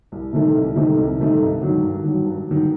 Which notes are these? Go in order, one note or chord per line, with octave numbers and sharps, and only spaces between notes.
C2
C3 D#3 A3 D#4
C2
C3 D#3 A3 D#4
C2
C3 D#3 A3 D#4
G2
D#3 F#3
G2
D#3 F#3
G2
D#3 F#3